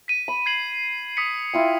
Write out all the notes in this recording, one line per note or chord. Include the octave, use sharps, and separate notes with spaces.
B6 D#7
B5
G#6 C7 F#7
D#6 B6 C#7
E4 F4 G5